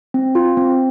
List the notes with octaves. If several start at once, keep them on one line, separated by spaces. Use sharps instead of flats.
C4
F4
C4